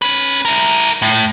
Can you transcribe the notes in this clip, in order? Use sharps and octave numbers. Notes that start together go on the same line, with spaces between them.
C#4 B4
E4 A#4
A2